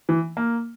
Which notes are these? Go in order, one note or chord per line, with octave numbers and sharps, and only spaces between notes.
E3
A#3